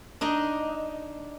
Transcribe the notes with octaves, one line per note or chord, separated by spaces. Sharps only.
D4 D#4 D#5